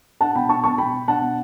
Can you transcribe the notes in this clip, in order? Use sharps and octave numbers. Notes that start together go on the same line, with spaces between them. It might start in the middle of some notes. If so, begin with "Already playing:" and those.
D4 F#5 A5
B2 G5 B5
D4 A5 C#6
B2 A5 C#6
B2 G5 B5
B2
D4 F#5 A5
B2